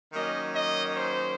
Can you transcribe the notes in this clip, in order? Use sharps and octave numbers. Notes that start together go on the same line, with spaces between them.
D#3 F#3 A#3 C#4 D#5
D#5
C5